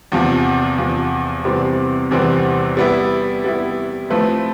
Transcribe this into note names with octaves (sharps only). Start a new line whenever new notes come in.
E2 C3 F3
E2 C3 F3
E2 C3 E3 G3 C4
E2 C3 E3 G3 C4
G3 B3 E4
G3 B3 E4
F3 A3 C4 E4 B4